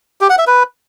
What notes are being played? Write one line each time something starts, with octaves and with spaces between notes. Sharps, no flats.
G4
F#5
E5
B4